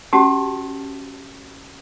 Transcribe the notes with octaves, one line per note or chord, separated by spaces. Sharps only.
C#4 F#4 G4 A5